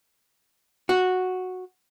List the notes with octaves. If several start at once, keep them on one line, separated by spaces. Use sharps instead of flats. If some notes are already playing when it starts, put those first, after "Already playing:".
F#4